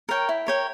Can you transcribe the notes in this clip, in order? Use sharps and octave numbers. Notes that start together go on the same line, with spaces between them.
A#4 C#5 G5
E4
A#4 C#5 G5